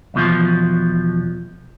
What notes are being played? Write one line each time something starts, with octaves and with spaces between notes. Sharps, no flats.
B1 E2 B2 F3